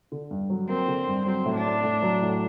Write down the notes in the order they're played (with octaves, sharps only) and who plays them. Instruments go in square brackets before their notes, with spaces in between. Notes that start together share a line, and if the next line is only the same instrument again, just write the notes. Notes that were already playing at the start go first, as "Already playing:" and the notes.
[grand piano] D3
G2
F#3
[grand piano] A#3 [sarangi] C4
[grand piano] D3
G2
[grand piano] F#3 [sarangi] C4
[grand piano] A2
[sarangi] D4
[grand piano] A3
A2
F#3
A2